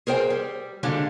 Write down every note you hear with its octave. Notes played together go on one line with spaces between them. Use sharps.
G#4 A#4 C5 G5
G3
D3 G3 G#3 A#3 D4